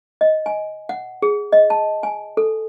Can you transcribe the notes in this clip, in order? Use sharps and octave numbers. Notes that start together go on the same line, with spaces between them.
D#5
G#5
F#5
G#4
D#5
A5
G#5
A4